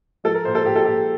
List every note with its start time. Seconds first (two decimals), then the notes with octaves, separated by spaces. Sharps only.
0.24 F3 A4
0.34 A#4
0.45 A#2 C5
0.55 A4
0.65 A#2 G4
0.76 A4
0.84 A#2 G4